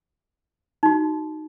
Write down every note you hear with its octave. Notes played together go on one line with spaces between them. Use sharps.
D#4 F#4